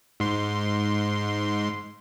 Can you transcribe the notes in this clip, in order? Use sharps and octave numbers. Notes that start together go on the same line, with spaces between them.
G#2 C6